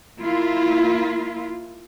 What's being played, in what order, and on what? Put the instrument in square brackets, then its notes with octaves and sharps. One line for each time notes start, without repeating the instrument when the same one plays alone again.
[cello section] A#3 E4 F4